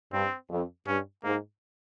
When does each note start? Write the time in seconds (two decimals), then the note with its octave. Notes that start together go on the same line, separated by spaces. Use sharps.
0.12 G2 C4
0.50 F2
0.86 G2 C#4
1.24 G#2 A#3